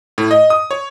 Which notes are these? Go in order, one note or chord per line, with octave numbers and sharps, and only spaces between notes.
A2
D#5
D#6
C#5